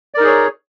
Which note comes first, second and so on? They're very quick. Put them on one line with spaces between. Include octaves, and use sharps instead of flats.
D5 A#4 D#4 G#4 C#5